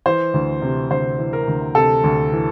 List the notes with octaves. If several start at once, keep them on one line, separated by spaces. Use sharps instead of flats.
E3 C5
D2
C3
D2 C5
E3
A#4
D2
C3 A4
D2
E3